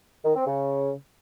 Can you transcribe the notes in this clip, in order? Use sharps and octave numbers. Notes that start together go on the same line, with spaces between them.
D#3
C4
C#3